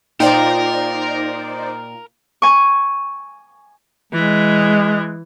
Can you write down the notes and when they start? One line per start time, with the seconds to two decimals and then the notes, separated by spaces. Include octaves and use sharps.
0.20 A#2 D#4 F4 A#4 C5 D5 G5
2.42 G#5 C#6
4.13 E3 G#3